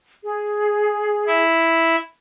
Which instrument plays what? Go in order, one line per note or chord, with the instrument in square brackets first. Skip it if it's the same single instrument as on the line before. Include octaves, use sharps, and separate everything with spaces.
[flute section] G#4
[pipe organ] E4